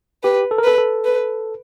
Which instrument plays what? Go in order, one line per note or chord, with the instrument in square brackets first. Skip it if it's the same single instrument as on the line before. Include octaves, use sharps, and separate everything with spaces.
[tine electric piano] G4 [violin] B4
[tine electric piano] A4
A#4
[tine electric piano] A4 [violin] B4
[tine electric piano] A4
[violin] B4